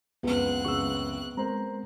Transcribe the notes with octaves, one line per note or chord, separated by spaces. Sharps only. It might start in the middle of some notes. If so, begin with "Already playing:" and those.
C#2 F#2 B3 C4 F#6
C#2 F#2 C#3 C#6 E6
G#3 C4 A#4 C5 A#5